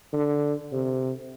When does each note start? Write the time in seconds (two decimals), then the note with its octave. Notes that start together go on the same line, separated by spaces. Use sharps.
0.13 D3
0.72 C3